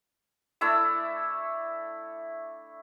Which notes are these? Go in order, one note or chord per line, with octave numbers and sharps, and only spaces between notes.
A3 D4 E4 E6